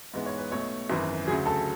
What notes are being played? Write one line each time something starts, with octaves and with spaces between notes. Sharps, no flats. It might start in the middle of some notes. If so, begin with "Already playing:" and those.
G#2 E3 G#3 B3
C#5
B4
B1 B2 A3 C#5
G#1 F#2 E3
D2 C#3 F#3 G#4 G#5
A4 A5